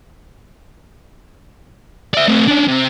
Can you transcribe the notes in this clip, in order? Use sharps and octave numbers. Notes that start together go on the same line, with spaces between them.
D5 E5
A3 C4
C#4 D4
C3